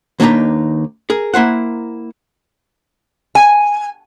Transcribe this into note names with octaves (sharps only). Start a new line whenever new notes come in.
D#2 A#3 D4 D#4 B4 A#5
G#4 A#4
A#3 E4 C5 F#5
G#5